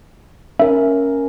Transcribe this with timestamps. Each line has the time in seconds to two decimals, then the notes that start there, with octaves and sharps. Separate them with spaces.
0.59 C#4 A#4 E5